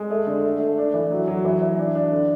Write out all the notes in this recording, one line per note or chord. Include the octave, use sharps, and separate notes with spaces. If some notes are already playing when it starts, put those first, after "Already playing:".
Already playing: G#3
A3
D3
A3
A3
D4
E3
F#3
F#3
E3
E3
D4
D4
D3